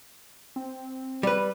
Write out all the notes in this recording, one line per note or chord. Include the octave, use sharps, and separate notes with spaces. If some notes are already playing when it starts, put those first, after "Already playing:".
C4
G3 B4